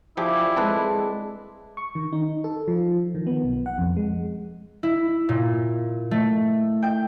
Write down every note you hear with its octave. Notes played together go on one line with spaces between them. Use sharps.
F3 D4 E4 G4 G#4 B5 D6
G#3 C4 A4 B4 A5 C6
C#6
D#3
D#4
A4
F3
D#3
B3
B1
F#5
F2
G#3
E4
A#2
A3
G5